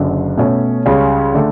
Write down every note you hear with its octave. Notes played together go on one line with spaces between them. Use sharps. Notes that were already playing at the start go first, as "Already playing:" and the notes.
Already playing: F#1 F#2 D3
B2 A3 C#4
C#2 C#3 G3 C#4
D3 A3